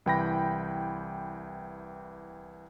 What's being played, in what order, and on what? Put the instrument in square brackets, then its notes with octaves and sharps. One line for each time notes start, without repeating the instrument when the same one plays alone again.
[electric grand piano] C2 E3 G5 B5 A#6